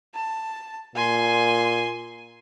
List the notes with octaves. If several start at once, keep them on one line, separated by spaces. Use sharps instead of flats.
A5
A#2 G#5 C6